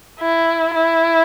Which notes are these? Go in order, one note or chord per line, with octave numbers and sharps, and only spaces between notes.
E4
E4